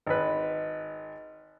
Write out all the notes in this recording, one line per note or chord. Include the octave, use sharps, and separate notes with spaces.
G#1 B4